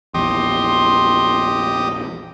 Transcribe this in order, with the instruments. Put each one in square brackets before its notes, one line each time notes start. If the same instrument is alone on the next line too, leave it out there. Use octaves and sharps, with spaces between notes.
[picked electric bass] A#1 E2 [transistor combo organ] G4 D#5 [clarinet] C6